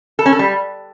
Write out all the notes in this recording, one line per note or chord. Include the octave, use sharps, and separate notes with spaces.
A4
C#4
A4
G3